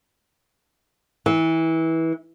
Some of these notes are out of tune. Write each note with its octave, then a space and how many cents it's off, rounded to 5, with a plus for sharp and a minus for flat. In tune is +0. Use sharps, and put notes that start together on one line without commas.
E3 -20